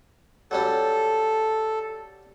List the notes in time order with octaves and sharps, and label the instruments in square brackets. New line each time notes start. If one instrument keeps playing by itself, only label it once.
[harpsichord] F#3 G3 C#4 [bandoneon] A4